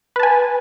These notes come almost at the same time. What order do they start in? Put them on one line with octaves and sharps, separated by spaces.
B4 A5 G#5